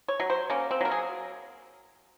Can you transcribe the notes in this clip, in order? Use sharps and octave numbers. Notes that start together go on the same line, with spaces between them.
C#5
F#3
C5
A#3 C#4
C4
F#3 A#4
G#4